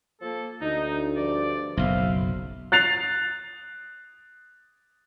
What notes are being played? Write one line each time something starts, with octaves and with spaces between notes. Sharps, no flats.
F3 A#3 A4
D2 D#4
G2 F3 D5
F#1 B1 C5 E5 F5
F#6 A6 C7 F7